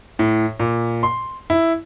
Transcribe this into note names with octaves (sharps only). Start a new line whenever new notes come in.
A2
A#2
C6
E4